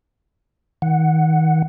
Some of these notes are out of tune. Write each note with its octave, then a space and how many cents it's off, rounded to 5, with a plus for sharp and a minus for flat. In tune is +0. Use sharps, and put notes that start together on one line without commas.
D#3 +35 F#5 +0